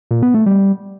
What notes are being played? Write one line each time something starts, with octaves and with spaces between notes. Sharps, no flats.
A#2
B3
A3
G3